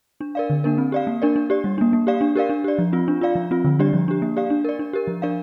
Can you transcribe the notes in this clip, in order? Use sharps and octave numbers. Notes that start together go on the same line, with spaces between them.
D4
A#4 D5 F5
D3
A#3 D4 A#4
C4
G4 D5 F5
A#3
D4 A#4 D5
D4
G4 D5
G3
A#3 D4
A#3
G4 D5 F5
D4
G4 A#4 D5 F5
D4
G4 D5
F3
C4 F4
D4
F4 D5 F5
F3
C4 F4
D3
G3 D4 G4 D5
F3
D4 G4
A#3
G4 D5 F5
D4
A#4 D5
D4
G4 A#4
F3
D4 A#4 D5 F5